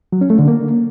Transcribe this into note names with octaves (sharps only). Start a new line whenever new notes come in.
F#3
C#4
A3
D3
A#3